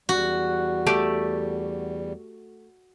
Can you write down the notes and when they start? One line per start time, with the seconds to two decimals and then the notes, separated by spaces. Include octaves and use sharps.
0.09 E2 G3 F#4
0.86 A3 G4 D5